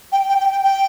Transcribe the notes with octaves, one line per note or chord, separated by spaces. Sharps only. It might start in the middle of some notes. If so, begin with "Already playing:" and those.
G5
G5
G5
G5
G5